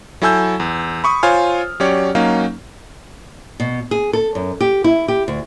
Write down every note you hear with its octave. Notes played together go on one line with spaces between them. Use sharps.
F#3 E4 A4 G#5 E6 G6
E2
B5 C#6 D#6
F4 C5 C#5 G#5 F6
F#3 C#4 G4 C#5 D5
F#3 A#3 C#4 D#4 F5
B2
G#4
A4
F#2
G4
E4
G4
D2